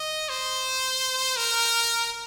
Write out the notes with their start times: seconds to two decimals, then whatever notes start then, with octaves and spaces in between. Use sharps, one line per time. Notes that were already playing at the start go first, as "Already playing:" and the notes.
Already playing: D#5
0.29 C5
1.37 A#4